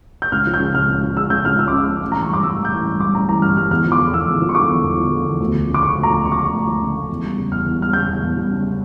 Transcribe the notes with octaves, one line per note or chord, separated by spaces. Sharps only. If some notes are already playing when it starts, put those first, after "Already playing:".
G6
C#2 F6
F3
G6
C#3
C#2 F6
C#2
F3
C#3 E6
C#2 G6
C#2 F6
F3 E6
D6
C#3 E6
C#2
A1
E3 A#5
C#6
G2 D6
G3 E6
A1
G6
E3
G2
G3 D6
A1 A#5
E3 A#5
G2 F6
G3 F6
E2 F6
F3
D6
D3
E2 E6
E2
F3
C#6
D3 D6
E2
E2
F3
D3
E2
D2
F3
C#3
D6
A3 C#6
D2
A#5
F3
C#3 C#6
D6
A3 C#6
D2
F3 C#6
C#3
A3
E2
G3
C#3
E2 F6
E2
G3 F6
C#3 G6
E2
E2
G3
C#3